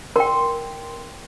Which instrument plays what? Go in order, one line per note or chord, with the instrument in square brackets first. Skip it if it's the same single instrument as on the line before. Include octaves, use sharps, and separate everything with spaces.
[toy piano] A#4 G5 [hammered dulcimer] C6